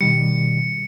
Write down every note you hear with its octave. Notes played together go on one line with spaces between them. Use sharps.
B2 D#3 G3 C#7